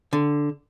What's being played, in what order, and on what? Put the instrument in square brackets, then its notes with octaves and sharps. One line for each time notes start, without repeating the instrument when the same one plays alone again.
[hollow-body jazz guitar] D3